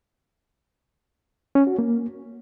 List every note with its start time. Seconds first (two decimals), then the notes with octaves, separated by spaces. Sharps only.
1.55 C#4
1.67 F#4
1.79 A#3